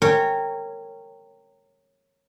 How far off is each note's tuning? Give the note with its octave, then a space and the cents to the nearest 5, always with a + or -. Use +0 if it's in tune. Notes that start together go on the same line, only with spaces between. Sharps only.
A#4 -20 C#5 -10 G5 +0